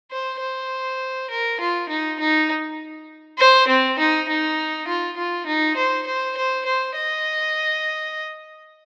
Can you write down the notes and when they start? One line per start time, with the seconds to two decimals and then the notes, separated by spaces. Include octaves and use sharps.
0.10 C5
0.40 C5
1.30 A#4
1.60 F4
1.89 D#4
2.19 D#4
3.39 C5
3.68 C4
3.99 D#4
4.28 D#4
4.87 F4
5.17 F4
5.46 D#4
5.76 C5
6.06 C5
6.37 C5
6.66 C5
6.96 D#5